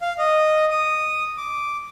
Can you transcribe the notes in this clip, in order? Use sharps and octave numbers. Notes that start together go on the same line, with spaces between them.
F5
D#5
D#6
D6